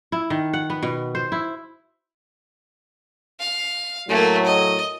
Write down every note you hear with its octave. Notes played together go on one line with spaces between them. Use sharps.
E4
D#3
F#5
B3
B2
C5
E4
F5
A2 F#3 A3 A#3
D#5